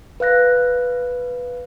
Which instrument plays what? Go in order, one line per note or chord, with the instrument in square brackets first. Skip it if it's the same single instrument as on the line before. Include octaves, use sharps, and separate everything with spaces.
[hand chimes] B4 F5 F#6 A#6